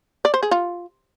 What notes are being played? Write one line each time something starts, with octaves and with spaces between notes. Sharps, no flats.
D5
C5
G#4
F4